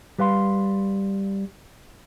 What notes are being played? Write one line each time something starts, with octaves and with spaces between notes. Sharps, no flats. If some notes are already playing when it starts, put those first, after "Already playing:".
G3 B4 F5 C6